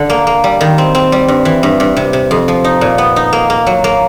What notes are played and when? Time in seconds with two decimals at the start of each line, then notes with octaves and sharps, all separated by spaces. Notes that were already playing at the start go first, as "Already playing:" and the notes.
Already playing: D3
0.10 A#3
0.27 A#3
0.44 G3
0.61 D#3
0.78 C4
0.95 C4
1.12 G3
1.28 G2
1.45 E3
1.63 G2
1.80 G2
1.96 C3
2.13 C3
2.31 F2
2.48 F3
2.64 D#4
2.81 A#2
2.98 B3
3.16 D#4
3.33 A#3
3.50 A#3
3.66 F#3
3.84 A#3